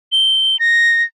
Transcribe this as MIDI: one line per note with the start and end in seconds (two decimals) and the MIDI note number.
0.12 0.59 103
0.59 1.03 94